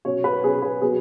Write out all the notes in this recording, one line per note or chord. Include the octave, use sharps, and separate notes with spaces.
B2 F#3 C#4 C#5
B4
B2 F#3 C#4 G#4
B4
B2 F#3 B3 G#4